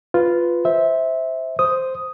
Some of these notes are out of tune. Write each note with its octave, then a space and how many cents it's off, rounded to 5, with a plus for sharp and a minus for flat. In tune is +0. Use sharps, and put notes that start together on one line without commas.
F4 +0 B4 +5
C5 +0 E5 -15
C5 +0 D#6 +0